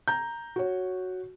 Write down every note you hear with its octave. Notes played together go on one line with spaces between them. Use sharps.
A#5 G6
F#4 C#5